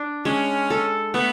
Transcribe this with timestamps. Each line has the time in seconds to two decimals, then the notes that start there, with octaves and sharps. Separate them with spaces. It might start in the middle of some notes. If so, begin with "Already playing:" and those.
Already playing: D4
0.25 G#3 C#4
0.70 A4
1.14 A3 B3